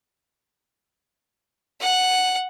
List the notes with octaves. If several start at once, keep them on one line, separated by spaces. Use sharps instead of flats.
F#5